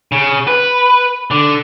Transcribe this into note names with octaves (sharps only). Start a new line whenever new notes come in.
C#3
B4
D3